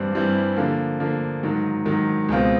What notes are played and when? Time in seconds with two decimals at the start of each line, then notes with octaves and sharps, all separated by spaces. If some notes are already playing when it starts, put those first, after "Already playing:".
Already playing: G2 E3 G3 C4 E4
0.13 G2 E3 G3 C4 E4
0.57 D3 F3 A#3
1.00 D3 F3 A#3
1.43 G#2 D#3 F#3
1.85 G#2 D#3 F#3
2.29 C#2 B2 G#3 C4 F4